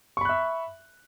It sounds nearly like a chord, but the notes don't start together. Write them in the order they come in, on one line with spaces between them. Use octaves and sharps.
C#6 B5 F#6 E5